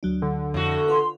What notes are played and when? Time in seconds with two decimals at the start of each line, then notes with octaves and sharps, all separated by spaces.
0.03 D2 F#3 D4
0.22 D3
0.54 F2 A2 F#4
0.88 F4 B4 C6